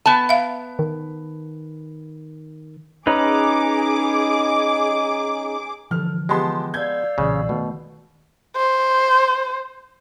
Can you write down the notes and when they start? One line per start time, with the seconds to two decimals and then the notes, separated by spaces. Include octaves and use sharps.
0.06 B3 A5
0.29 E5 F5
0.79 D#3
3.07 C#4 D#4 G#4 B4 D6
5.91 D3 E3 F3 A4 F6
6.29 G#3 B3 F4 G4 A5 C6
6.74 D5 F5 E6 G6 G#6
7.18 B1 A#2 C#3 E3
7.49 B2 D#3 A3
8.56 C5